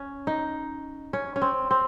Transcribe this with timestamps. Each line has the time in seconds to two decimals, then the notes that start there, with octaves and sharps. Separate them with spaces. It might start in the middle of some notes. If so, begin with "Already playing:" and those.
Already playing: C#4
0.27 D#4
1.13 C#4
1.36 C#4
1.42 C4
1.71 C4